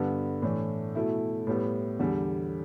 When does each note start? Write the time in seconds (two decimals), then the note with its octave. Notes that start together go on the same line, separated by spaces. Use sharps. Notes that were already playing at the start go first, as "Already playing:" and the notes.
Already playing: G2 D3 B3
0.42 A2 E3 A3 D4
0.95 B2 A3 E4
1.47 A2 G3 B3
1.99 E2 D3 G3